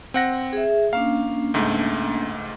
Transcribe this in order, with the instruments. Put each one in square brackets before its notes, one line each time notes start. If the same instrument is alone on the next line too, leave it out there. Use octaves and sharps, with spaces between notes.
[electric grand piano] C4 F#5 A#6
[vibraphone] G#4 E5
[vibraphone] A#3 C#4 D4 [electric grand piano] F5
[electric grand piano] C#2 G#2 A3